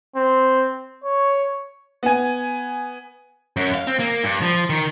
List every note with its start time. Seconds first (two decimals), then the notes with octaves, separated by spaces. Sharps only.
0.16 C4
1.04 C#5
2.03 B3 G#5
3.57 F#2
3.74 F5
3.87 C4
4.00 A#3
4.24 G2
4.42 F3
4.70 D#3